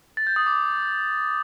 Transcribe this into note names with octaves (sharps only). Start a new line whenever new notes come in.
A6
G6
D#6
D6